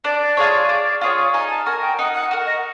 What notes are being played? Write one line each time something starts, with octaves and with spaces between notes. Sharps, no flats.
D4 D5
F4 G#4 C#5
D4
F4 G#4 C#5
D#4 G#5
A5
F#4 A#4 G#5
G5
D#4 F#5
F#5
F#4 A#4
D#5